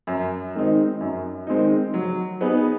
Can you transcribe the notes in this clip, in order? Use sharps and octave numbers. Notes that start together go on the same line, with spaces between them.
F#2
D#3 G#3 C4 D#4
F#2
D#3 G#3 C4 D#4
F#3
B3 D#4 G#4 B4